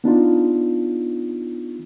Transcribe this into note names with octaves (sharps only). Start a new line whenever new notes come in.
B3 D4 D#4 F4